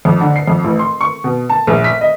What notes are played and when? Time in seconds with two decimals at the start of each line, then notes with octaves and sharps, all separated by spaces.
0.05 F2
0.21 D3
0.36 C7
0.47 F2
0.64 A1
0.79 C6
1.01 C#6
1.24 B2
1.49 A5
1.67 A#1
1.84 B6
2.01 D#5